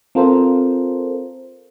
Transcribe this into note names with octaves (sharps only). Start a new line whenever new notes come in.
C4 F4 A4 A#4 C5